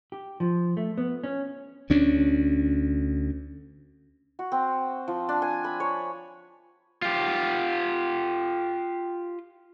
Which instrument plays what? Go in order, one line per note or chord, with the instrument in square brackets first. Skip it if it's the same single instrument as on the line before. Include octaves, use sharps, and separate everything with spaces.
[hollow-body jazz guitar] G4
F3
A3
B3
C#4
[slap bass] D2 C#4 D4
[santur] F#4
C4
F3
D4
G#5
B5
C#5
[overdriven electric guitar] F4 G4